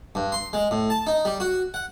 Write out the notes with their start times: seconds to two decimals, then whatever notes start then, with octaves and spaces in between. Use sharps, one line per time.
0.15 G2
0.32 C6
0.53 G#3
0.71 A2
0.90 A5
1.07 D#4
1.25 G3
1.40 F#4
1.74 F#5